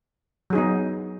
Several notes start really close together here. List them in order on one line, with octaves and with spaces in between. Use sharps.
F#3 G#4 D#4 B3